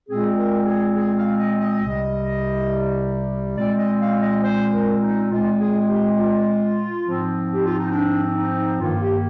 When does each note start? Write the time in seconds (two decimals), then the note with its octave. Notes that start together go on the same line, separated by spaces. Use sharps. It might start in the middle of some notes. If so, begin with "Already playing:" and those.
0.08 A#2 G#3 C4 G#4
0.38 A#4
0.66 G#4
0.96 G#4
1.18 F5
1.39 D#5
1.61 D#5
1.83 C2 C3 G3
3.57 A#2 G#3 C4 D5
3.79 D#5
4.00 F5
4.22 D#5
4.43 C5
4.73 A#4
5.02 D#4
5.31 A#2 G#3 C4 F4
5.59 G#4
5.89 G4
6.17 F4
7.05 G#2 F3 C4
7.53 G4
7.66 F4
7.79 D#4
7.92 D4
8.35 D#4
8.79 G2 D#3 A#3 F4
9.01 G4